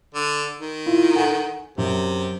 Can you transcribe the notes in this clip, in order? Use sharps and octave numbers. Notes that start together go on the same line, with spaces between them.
D3
D#3
E4 F4
A4 F#5 G#5
F#2 C3